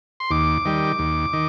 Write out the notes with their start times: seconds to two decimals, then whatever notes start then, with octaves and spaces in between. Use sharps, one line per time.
0.20 C6
0.31 D#2 D6
0.65 D#3 G3
0.99 D#2
1.33 D#3